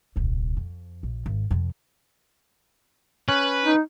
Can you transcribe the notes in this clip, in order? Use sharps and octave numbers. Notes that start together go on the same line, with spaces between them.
D#1 C2
F2
A#1
G#1
F2 C3
C#4 B4
D#4